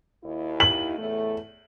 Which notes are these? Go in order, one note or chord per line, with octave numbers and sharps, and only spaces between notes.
D#2 E4
F#7
E2 A2 A3